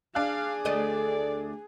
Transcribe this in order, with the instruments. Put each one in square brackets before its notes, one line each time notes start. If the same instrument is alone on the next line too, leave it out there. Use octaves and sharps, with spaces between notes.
[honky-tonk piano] D4 F#6 [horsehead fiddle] G#4 [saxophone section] F5
[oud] D2 A3 D#5 [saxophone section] D5